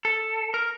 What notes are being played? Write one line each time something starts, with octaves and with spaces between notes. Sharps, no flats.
A4
A#4